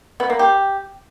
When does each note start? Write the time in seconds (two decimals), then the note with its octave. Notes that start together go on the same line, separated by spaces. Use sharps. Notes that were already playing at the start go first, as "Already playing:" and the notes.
0.20 B3
0.30 A#3
0.39 G4